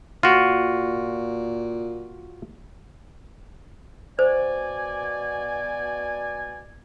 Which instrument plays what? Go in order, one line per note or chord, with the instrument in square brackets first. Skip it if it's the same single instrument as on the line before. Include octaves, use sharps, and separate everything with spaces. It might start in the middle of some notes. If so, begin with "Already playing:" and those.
[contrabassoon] A#2 [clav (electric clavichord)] F4 F#4
[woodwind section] B2 D5 G#5 [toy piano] C5